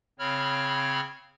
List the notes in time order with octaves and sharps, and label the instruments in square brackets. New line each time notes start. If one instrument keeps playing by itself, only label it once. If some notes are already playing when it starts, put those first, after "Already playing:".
[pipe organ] C#3 C4 C#5 B5 F6